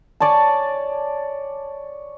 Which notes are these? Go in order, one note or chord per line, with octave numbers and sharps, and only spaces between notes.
C#5 D5 G#5 A5